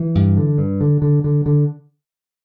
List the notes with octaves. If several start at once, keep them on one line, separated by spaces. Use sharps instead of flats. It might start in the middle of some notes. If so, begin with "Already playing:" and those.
Already playing: E3
G2
D3
G2
D3
D3
D3
D3